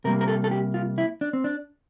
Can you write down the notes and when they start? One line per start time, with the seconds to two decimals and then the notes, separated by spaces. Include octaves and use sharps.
0.05 C3 G3 A#3 A#4
0.21 A#4
0.28 A4
0.44 A4
0.51 G4
0.74 F4
0.98 E4
1.21 D4
1.33 C4
1.44 D4